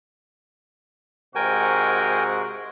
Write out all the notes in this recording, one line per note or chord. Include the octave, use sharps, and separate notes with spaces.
G#2 C3 F#4 A#4 G5 G#5